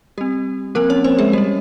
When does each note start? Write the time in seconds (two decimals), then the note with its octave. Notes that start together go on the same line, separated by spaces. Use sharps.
0.18 G3 C4 G4
0.75 F3 A#3 C4 A#4
0.90 C#4 C#5
1.04 C4 C5
1.19 G#3 G#4
1.33 G3 C#4 G4